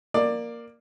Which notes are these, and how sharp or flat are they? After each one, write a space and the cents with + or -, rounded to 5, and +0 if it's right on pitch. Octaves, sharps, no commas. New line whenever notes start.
A#3 +0 D5 +10